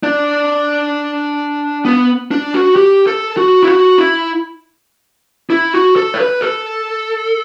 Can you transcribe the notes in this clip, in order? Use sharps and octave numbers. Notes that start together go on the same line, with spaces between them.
D4
B3
D4
F#4
G4
A4
F#4
E4
F#4
E4
E4
F#4
A4
C#5
B4
A4